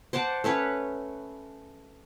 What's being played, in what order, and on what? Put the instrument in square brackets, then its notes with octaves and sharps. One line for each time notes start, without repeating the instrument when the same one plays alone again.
[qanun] C5 D5 F#5 A5
A3 C#4 B4 C#5